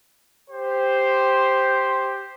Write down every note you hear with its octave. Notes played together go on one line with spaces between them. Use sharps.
G4 C5